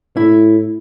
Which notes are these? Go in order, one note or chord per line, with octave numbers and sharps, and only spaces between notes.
A2 E4